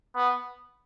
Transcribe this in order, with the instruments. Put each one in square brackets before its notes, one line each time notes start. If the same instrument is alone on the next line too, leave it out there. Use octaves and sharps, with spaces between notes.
[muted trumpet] B3